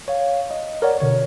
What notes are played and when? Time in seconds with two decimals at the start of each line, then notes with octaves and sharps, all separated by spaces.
0.08 C#5 F5
0.51 D#5
0.82 A#4 C#5 D5 F#5
1.00 B2 D3 C#5